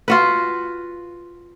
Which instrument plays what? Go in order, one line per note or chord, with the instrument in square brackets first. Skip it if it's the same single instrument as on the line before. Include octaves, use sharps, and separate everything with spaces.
[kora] F4 F#4 B4